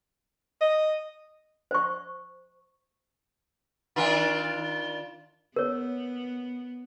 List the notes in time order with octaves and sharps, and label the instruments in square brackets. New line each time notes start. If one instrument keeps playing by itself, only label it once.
[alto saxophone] D#5
[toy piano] C5 C#6
[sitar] D#3 D4 F4
[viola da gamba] B3 [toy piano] A#4 C#5